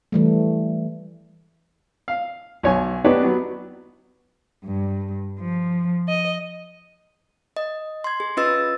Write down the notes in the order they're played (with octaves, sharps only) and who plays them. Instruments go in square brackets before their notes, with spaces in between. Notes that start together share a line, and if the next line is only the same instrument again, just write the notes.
[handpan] E3 G3 A3
[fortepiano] F5
B1 C#5 G#5
B3 D4 D#4 G4 B4 C#5
F#3 B3
[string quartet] G2
F3
D#5
[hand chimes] D#5
C6 G#6
G#4
C#4 F4 B4 D#5 E6 A6